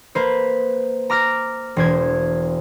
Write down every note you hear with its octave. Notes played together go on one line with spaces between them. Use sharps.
A#3 B4 C5
A#5 D6 F6 A#6
E1 C5 G#6